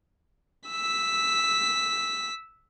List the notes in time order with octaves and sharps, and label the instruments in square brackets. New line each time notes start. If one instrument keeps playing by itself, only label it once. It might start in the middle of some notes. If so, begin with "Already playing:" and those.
[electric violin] E6 B6